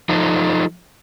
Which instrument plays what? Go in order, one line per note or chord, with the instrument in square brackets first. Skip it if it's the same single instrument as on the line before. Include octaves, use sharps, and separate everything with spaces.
[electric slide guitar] F3 D#4 A4